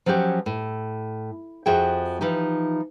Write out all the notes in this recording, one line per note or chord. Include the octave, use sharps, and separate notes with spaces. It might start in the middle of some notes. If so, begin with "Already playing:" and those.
F3 F#3 C#4 F#4 G4
A2
F2 F3 F#4 G#4 E5 G5
E3 F3 D#4 G4